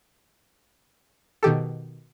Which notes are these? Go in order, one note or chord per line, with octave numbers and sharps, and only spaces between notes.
B2 D#3 G4 A4